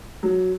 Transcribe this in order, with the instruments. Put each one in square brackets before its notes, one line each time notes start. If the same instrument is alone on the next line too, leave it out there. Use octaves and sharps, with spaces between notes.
[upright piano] F#3